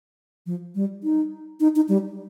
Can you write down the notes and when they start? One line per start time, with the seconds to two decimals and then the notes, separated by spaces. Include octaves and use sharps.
0.46 F3
0.75 G3
1.04 D#4
1.60 D#4
1.76 D#4
1.89 G3